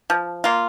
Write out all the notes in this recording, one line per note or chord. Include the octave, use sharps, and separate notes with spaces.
F3
A#3 F4